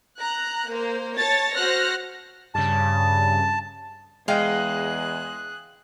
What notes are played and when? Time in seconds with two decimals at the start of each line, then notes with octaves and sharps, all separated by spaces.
0.19 A#5 F#6
0.69 A#3 C5
1.18 C#5 A5 A6
1.54 F#4 C5 F6 F#6 A#6
2.55 G2 C#3 A5
4.28 E2 G#3 G#4 D#5 F5 G5 F#6